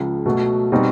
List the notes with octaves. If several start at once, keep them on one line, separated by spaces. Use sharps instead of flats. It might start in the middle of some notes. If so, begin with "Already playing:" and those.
Already playing: C#2 C#3 F3
B2 F#3 A3
B2 G3 C4 D#4